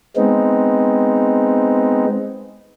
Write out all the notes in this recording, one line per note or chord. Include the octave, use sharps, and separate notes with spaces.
G#3 B3 C4 D#4